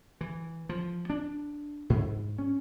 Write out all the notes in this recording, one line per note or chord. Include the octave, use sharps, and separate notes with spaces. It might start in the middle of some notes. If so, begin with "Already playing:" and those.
E3
F3
D4
G#2
C#4